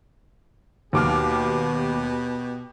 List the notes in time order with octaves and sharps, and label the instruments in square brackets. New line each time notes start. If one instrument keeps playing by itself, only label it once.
[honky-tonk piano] D#2 D6 F6 [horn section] B2 G4